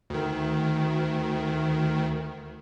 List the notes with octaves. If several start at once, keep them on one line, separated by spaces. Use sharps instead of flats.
D2 D#3